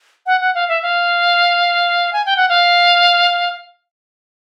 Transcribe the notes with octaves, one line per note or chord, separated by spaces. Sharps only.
F#5
F#5
F5
E5
F5
G#5
G5
F#5
F5